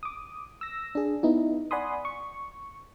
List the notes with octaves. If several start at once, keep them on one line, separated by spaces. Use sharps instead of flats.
D6 D#6
E6 A#6
D4 G#4
B3 D#4 E4
D5 F#5 G#5 B5 C6 D#6
C#6